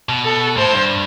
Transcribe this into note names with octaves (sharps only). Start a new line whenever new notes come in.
B2
A4
A2 C5
G2